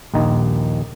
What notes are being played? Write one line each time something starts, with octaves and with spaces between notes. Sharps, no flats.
A#1 D#2 D#3 D#4